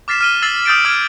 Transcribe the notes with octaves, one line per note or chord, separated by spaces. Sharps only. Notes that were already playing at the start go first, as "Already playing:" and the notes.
D6 F6 A6 B6 C7 E7
F6 D#7 G7
E6 A6 C7 F#7
D#6 E6 G6 A6 C7 D7
D6 F6 G#6 F#7